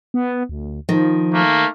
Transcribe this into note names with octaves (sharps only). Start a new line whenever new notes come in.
B3
D2
D#3 F3
A3 A#3